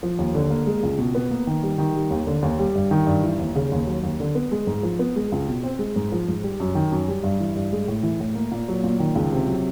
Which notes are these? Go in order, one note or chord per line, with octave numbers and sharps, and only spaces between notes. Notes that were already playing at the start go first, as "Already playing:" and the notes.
F3
D#2
D3
A#3
G#3
C#2
B2
B3
A#3
D#3
G3
D#3
G3
D#2
D3
D#2
G3
G2
D#3
G2
E3
D#2
C#3
D#2
F#3
D#2
D3
B3
G#3
G#2
F3
B3
G#3
C#2
B2
C4
G#3
G#2
F3
G#2
G3
F#2
D#3
F#2
G3
G2
E3
G2
G#3
A2
E3
A2
A#3
A#2
F#3
A#2
D#3
C#2
C3
F#3